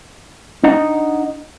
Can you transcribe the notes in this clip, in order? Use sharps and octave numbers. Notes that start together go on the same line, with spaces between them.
D4 D#4 D#5 F#5 A#5